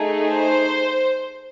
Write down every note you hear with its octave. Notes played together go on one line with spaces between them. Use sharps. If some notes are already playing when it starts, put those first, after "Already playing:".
Already playing: A3 D#4 G#4
C5